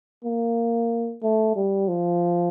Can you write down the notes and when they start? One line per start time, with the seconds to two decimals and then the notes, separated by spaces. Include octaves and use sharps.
0.24 A#3
1.23 A3
1.56 G3
1.88 F3